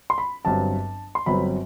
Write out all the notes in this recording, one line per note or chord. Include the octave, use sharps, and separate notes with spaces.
C6
B5
G1 G2 F#3 C4 A5
C6
G1 G2 F#3 C4 B5